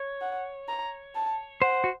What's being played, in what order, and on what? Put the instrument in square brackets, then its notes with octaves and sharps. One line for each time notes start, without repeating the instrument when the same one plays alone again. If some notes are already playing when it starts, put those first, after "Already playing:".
Already playing: [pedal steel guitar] C#5
[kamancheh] F#5
A#5
A5
[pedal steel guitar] C5 [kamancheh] F#5
[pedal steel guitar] F#4